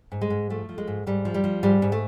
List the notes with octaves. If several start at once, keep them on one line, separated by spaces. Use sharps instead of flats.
G#2
G#3
G#2
F3 A3
F3
G#3
G#2
G#2 G3
F3
G3
F3
G#2 G3
G#2
A3